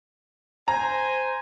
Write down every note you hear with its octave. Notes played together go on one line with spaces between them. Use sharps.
C5 G#5 A#5